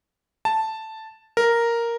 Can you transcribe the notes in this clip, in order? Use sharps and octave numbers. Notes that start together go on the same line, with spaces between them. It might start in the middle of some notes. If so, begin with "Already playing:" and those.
A5
A#4